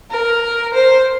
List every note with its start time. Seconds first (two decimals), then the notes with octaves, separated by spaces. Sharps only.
0.11 A#4
0.74 C5